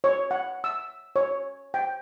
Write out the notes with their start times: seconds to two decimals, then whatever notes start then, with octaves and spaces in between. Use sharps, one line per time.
0.04 C#5
0.31 F#5
0.64 E6
1.16 C#5
1.74 G5